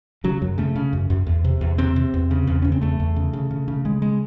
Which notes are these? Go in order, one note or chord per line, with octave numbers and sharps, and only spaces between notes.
C#3 F#3
F#2 F#3
C#3 A3
C#3
F#2
F#2
E2
C3
E2
C3 C4
C3
E2
C#3
E2
C#3 C#4
C4
E2 A3
E2
C#3
C#3
C#3
C#3
C#3 G#3
G#3